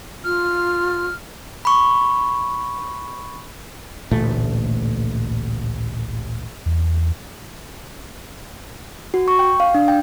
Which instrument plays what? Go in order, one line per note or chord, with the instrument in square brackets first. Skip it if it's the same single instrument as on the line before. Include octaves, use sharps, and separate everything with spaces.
[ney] F4 [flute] F6
[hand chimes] B5 C#6
[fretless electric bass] A1 D2 A#2 A3
[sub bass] E2
[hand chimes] F#4
C#6
G5
F5
D4
G5